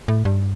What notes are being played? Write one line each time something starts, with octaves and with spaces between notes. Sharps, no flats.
A2
G2